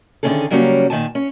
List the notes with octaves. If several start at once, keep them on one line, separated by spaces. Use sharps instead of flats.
D3 D#3 B3 C#4 G#4 A4
C#3 F#3 G3 A#3 C#4
A#2 D#3 G#5 A5
C#4